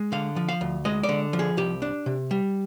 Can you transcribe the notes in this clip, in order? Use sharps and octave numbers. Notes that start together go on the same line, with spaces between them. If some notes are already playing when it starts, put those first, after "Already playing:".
Already playing: G#3
D3 F5
F3
F5
D2
G#3 D#5
D5
D3
F3
G#4
C2 G4
D4
C3
G3